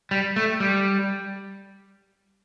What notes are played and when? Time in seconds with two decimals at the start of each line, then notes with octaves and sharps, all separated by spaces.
0.11 G3
0.36 A3
0.60 G3